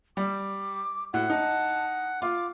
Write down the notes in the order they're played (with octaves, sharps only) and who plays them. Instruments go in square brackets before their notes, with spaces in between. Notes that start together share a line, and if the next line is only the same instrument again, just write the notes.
[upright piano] G3 [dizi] D6
[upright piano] A2 [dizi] F#4 [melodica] F#5
[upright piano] D#4 [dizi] A5
[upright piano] F4 [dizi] D6